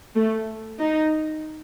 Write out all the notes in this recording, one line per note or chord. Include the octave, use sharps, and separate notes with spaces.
A3
D#4